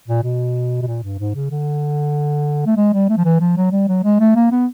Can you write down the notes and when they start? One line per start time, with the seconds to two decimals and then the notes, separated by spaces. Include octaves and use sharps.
0.08 A#2
0.23 B2
0.82 B2
0.87 A#2
1.03 G2
1.19 G#2
1.35 C#3
1.51 D3
2.66 A3
2.77 G#3
2.93 G3
3.09 A3
3.17 F3
3.25 E3
3.40 F3
3.57 F#3
3.72 G3
3.88 F#3
4.04 G#3
4.20 A3
4.36 A#3
4.52 B3